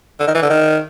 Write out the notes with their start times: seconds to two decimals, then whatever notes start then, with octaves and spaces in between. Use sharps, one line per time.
0.20 D3
0.27 D#3
0.35 E3
0.42 D3
0.50 D#3